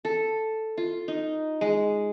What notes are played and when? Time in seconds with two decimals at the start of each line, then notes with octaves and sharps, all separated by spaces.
0.05 A4
0.78 F4
1.08 D#4
1.61 G#3